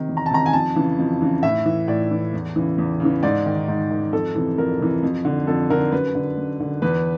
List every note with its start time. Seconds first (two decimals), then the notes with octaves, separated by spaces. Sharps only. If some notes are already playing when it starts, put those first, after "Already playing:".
Already playing: C3 D#3
0.09 E2
0.17 A#5
0.26 A5
0.31 C3 D#3 A#5
0.46 G#5
0.53 F2 A5
0.75 C#3 E3
0.99 F2
1.21 C#3 E3
1.43 A2 E5
1.66 E3
1.88 A2 D5
2.11 E3
2.33 E2
2.56 C#3 E3
2.78 E2
3.00 C#3
3.05 E3
3.23 G#2 D5
3.46 D#3
3.68 G#2
3.91 D#3
4.12 F2 A4
4.35 C3 E3
4.58 F2 A#4
4.80 C3 E3
5.03 F2
5.25 D3
5.47 F2 A4
5.70 D3 A#4
5.92 F#2 B4
6.15 D3
6.38 F#2
6.60 D3
6.82 E2 B4